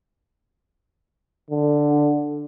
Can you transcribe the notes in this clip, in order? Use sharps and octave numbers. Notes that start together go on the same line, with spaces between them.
D3